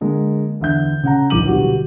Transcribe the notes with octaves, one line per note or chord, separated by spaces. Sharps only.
D3 G#3 A#3
E2 D3 E5 G6
C#3 F#5 A#5
D1 A#1 D6 D#7 F#7
B2 D3 G3 F#4